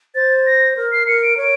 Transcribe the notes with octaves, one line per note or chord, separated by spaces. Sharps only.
C5 A6
A#6
A#4
C7
A#4 C#7
D7
C#5 D7